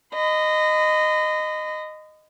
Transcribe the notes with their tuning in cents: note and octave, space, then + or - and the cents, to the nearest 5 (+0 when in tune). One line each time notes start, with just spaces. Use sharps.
D#5 -10 B5 +40